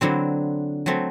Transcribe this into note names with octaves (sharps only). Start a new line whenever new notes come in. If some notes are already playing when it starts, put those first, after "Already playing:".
D3 F#3 C4 E4
F#3 A3 C4